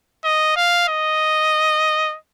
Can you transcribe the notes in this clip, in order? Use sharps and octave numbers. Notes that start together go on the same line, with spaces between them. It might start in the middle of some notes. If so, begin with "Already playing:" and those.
D#5
F5
D#5